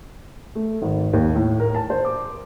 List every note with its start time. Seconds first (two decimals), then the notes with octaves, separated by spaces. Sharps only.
0.55 A3
0.82 G#1
1.13 D#2
1.35 A2
1.60 A#4
1.75 A5
1.90 C5
2.05 D6